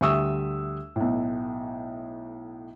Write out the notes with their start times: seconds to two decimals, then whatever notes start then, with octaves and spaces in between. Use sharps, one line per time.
0.01 D2 G3 E5 C#6 D#6 E6
0.96 B1 A2